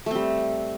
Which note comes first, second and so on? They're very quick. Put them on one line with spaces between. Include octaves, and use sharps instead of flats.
A3 C4 G3